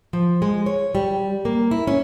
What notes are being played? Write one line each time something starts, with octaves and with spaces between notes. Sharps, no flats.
F3
G#3
C#5
G3
A#3
E4
C#4